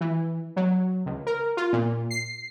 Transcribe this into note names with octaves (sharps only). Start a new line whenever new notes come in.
E3
F#3
C#2
A#4
F4
A#2
C7